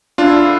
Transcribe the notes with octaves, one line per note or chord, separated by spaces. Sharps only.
E2 D3 F3 A3 D4 E4 F4